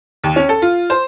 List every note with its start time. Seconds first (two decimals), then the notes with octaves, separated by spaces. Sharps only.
0.24 D#2
0.36 C#4
0.49 A4
0.62 F4
0.90 C5